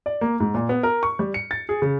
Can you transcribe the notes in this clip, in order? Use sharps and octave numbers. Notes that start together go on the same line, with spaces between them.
D5
A#3
G#2
A#2
B3
A#4
C#6
G3
C#7
A6
G#4
C#3